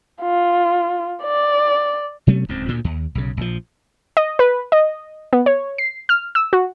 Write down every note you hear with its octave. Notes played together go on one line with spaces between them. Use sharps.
F4
D5
B2 F#3 A3 C#4
D1 C#2 G#2 C4
D2 A#2
D#2
B1 C#3
A#1 F3
D#5
B4
D#5
B3
C#5
C7
F6
E6
F#4